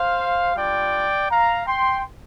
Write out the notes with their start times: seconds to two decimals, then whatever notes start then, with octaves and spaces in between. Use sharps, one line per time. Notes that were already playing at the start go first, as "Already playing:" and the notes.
Already playing: C5 F5
0.55 G3 D4 F4 D5 G5
1.30 F5 A#5
1.67 G5 C6